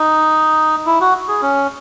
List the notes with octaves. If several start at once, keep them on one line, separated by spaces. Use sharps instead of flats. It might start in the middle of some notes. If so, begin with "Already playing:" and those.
Already playing: D#4
E4
F#4
G#4
C#4